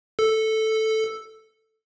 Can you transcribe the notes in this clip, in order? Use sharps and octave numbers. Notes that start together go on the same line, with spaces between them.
A4